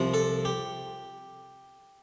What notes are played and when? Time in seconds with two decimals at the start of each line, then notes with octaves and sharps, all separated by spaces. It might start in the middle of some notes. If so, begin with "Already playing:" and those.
Already playing: C2 C3 F3
0.14 A4
0.45 G4